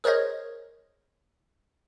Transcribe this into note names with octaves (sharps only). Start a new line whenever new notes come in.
G#4 A#4 C5 C#5 D#5